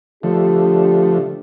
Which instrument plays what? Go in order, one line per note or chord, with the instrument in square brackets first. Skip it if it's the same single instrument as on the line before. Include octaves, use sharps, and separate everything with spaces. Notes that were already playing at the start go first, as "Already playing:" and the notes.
[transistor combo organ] D3 F3 A3 [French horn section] D4 G4